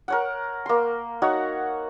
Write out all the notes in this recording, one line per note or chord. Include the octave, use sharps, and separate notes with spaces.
A#4 C#5 F#5
A#3 C6
D#4 F#4 C#5 F#5